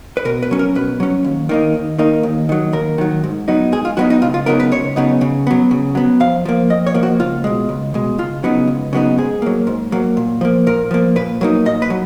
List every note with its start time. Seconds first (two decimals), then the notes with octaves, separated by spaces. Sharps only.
0.17 B4
0.25 B2 A#4
0.43 B4
0.51 F#3 C#4
0.59 A#4
0.75 B2 B4
1.00 F#3 C#4
1.24 D#2
1.49 D#3 A#3 D#4
1.74 D#2
1.98 D#3 A#3 D#4
2.23 D#2
2.49 D#3 F#3
2.73 D#2 A#4
2.98 D#3 F#3
3.24 G#2
3.48 F#3 B3 D#4
3.72 G#2 G#4
3.85 F4
3.97 F#3 B3 D#4 F#4
4.10 D#4
4.22 C#2 F4
4.34 F4
4.46 C#3 F#3 B3 D#4 A#4
4.60 B4
4.72 C#2 C#5
4.96 C#3 F#3 B3 D#4
5.21 C#3
5.47 F#3 B3
5.71 C#3
5.95 F#3 B3
6.20 F2 F5
6.45 F3 A#3
6.70 F2 D#5
6.87 C#5
6.94 F3 A#3
7.03 F#4
7.20 C#2 F4
7.44 B2 G#3
7.69 C#2
7.94 B2 G#3
8.18 C#2 F4
8.43 C#3 F#3 B3 D#4
8.68 C#2
8.93 C#3 F#3 B3 D#4
9.18 G#2 G#4
9.42 F#3 A#3
9.67 G#2
9.92 F#3 A#3
10.17 A#2
10.41 F3 A#3
10.67 A#2 A#4
10.91 F3 A#3
11.16 A#2 B4
11.41 F#3 A#3 D#4
11.66 A#2 D#5
11.82 B4
11.90 F#3